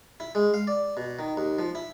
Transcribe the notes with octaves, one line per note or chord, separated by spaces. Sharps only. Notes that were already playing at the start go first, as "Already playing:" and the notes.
E4
G#3
F5
D5
B2
D#3
D#2
F3
E4